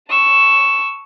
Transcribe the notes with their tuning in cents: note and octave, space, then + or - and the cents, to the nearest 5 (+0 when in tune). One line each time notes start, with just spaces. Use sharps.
A5 +0 C#6 +0 E6 +0